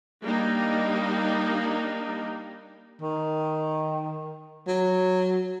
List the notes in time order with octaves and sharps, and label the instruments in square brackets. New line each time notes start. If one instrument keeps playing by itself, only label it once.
[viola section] G3 A#3 D4 D#4
[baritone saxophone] D#3
F#3